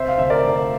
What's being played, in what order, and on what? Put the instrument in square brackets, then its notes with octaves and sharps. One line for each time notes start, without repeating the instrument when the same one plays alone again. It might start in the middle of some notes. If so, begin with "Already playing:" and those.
Already playing: [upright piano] C3 C5 E5
F5
D2 E5
A#4 D5
D2